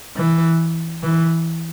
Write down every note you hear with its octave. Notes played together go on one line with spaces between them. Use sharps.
E3
E3